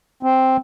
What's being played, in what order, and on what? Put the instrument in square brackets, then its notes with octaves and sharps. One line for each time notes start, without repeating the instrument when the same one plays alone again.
[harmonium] C4